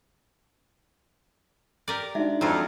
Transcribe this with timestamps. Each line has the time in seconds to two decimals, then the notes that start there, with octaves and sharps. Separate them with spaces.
1.88 G4 A#4 D5
2.15 G#3 D4 D#4 F#4 E5
2.41 F2 F#3 F4